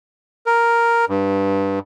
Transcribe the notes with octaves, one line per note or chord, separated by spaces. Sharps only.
A#4
G2